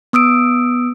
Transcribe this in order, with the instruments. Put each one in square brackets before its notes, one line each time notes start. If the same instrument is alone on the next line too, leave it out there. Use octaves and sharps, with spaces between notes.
[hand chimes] B3 D#6 E6 D7